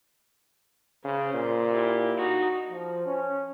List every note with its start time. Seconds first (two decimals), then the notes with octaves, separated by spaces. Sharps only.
1.04 C#3 C5
1.34 A#2
1.72 E4 G4
2.17 D#4 F#4
2.71 F3
3.06 C#4